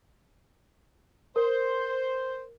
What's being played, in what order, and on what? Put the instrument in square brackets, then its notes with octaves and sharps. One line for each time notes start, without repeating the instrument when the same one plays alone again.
[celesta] A#4 [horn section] C5